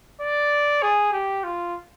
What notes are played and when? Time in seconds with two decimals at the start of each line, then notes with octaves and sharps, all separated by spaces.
0.21 D5
0.82 G#4
1.13 G4
1.44 F4